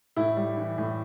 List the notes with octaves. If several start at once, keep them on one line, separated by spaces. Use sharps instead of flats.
A2 E4
G3
E3
A2